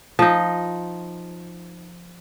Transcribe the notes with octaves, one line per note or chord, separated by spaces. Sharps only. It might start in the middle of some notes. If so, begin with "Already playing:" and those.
F3 D#4